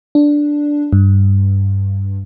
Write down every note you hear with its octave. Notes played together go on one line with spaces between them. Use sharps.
D4
G2